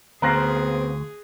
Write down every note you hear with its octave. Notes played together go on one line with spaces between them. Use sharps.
D2 B3 C4 G#4 F5 A#5 F#6 A#6